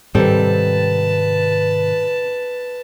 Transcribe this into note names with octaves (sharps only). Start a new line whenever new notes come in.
G#2 C3 D#3 G3 C4 A4 B4 A5